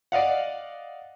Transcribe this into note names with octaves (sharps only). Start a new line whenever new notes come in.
D5 D#5 F5 F#5